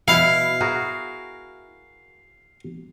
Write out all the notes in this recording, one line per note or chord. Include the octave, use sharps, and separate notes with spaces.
B2 E4 F5
F#4 G#4 A#4